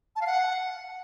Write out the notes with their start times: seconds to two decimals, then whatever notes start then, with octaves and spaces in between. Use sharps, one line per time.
0.16 A5
0.21 F5
0.27 F#5